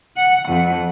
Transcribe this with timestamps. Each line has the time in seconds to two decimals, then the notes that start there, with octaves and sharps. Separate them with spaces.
0.17 F#5
0.49 F2 F#5